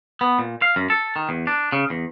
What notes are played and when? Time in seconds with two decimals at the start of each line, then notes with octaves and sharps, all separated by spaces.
0.21 B3
0.39 A#2
0.62 F5
0.76 F#2
0.90 A4
1.16 D#3
1.29 E2
1.47 D4
1.72 C#3
1.90 E2